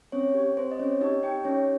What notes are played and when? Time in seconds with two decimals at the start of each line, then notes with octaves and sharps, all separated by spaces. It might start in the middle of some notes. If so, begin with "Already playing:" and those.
0.12 C4 C#4 C#5
0.35 G4
0.57 C4 C5
0.71 D#5
0.79 C4 C#4 C#5
1.01 D#4 G4 D#5
1.23 D#4 G4 G5
1.45 C#4 D#4 C#5